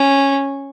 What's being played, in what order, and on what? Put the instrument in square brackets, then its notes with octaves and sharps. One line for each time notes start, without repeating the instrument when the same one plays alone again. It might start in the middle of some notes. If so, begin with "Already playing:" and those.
Already playing: [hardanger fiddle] C#4